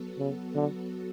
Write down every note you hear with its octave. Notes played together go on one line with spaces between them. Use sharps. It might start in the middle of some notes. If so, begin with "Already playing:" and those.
Already playing: F#3 B3 F#4 A4
C#3
D3